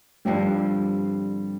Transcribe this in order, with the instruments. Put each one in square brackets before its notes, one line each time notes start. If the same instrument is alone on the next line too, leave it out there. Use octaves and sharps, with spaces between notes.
[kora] G2 D3 F3 C4 [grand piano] G3